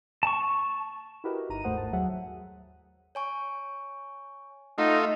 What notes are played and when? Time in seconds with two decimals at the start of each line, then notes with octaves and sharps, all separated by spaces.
0.23 A5 C#6
1.24 E4 F#4 G4 A#4 B4 D#5
1.49 G1 D#4 A#5 D#7
1.64 D#2 G#2 A3 C5 F#5 D#6
1.77 A5
1.93 D#2 F#3 G#4 E5 F#5
3.15 C#5 G#5 C#6
4.78 A3 D#4 F4 F#5